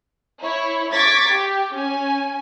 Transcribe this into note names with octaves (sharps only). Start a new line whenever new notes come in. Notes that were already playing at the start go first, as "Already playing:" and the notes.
E4 C#5
C#6 D6 G#6 A6 B6
G4
C#4 G#5